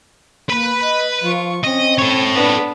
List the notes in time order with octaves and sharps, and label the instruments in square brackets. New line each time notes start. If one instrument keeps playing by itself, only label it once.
[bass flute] A#3 [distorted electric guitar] B4 B5
[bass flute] D#5
[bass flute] F3 [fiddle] F4 C#6
[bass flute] C4 [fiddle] C#4 [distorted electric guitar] D#5
[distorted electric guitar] A4 C#5
[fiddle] B3 D4